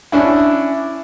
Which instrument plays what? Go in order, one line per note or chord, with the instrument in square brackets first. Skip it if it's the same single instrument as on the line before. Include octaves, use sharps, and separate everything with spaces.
[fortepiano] C#4 D4 E4